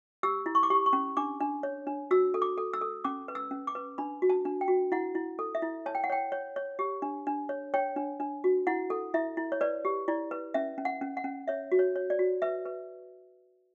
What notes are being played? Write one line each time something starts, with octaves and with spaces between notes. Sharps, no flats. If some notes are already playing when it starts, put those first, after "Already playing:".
G4 E6
E4
C#6
D6
G4 C#6
C#6
C#4
D4 D6
D4
C#5
D4
F#4 E6
A4
D6
A4
E6
A4
C#4 D6
B4
E6
C#4
D6
B4
D4 B5
F#4
A5
D4
G5
F#4
E4 F#5
E4
A4
E5
E4
C#5 A5
G5
F#5
C#5 G5
C#5
C#5
G4
D4
D4
C#5
C#5 G5
D4
D4
F#4
E4 F#5
A4
E4 E5
E4
C#5
B4 D5
G4
E4 D5
B4
C#4 E5
C#4
F#5
C#4
F#5
C#4
C#5 E5
F#4
C#5
C#5
D5
F#4
B4 E5
B4